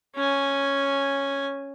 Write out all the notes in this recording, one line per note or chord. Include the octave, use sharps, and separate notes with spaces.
C#4 G#5